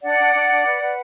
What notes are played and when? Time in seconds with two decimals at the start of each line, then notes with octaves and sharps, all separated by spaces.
0.03 D4 D5 F#5
0.18 D4
0.33 D4
0.49 D4
0.64 B4
0.80 B4